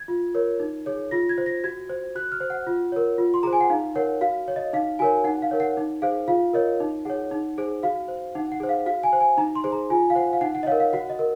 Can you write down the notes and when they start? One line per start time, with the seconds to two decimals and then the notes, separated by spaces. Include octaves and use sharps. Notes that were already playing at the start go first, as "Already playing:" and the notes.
Already playing: G#6
0.08 F4
0.35 A#4 C#5
0.60 D#4
0.86 G#4 C#5
1.11 F4 A#6
1.29 G#6
1.38 C5
1.46 A#6
1.64 F#4 G#6
1.90 C5
2.15 F#4 F#6
2.32 F6
2.40 C5
2.50 F#5
2.67 F4
2.92 A#4 C#5
3.18 F4
3.34 C6
3.43 G#4 C5 A#5
3.53 G#5
3.60 F#5
3.70 D#4 F5
3.95 A#4 C#5 F#5
4.21 F#4 F5
4.48 C#5
4.56 D#5
4.73 D#4 F5
4.99 F#4 A#4 C#5 G#5
5.24 D#4 F#5
5.42 F5
5.51 A#4 C#5
5.60 F#5
5.77 D#4
6.02 G#4 C5 F5
6.28 F4 F5
6.53 A#4 C#5 D#5
6.80 D#4
7.05 G#4 C#5 F#5
7.31 D#4
7.58 G#4 C5
7.83 F#4 F5
8.08 C5
8.35 D#4 F#5
8.52 F#5
8.60 G#4 C5
8.69 F5
8.86 F#4 F5
9.03 G#5
9.13 C5
9.21 G#5
9.38 D#4 A#5
9.55 C6
9.64 G#4 C5
9.72 A#5
9.90 F4 G#5
10.10 F5
10.16 C5 F#5
10.33 F5
10.41 D#4 F#5
10.55 F#5
10.63 D#5
10.67 C#5 F5
10.72 A#4
10.80 F5
10.93 F#4 F#5
11.10 D#5
11.19 A#4